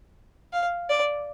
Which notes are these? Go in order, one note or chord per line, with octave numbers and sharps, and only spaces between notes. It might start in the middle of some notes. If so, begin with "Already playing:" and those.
F5
D5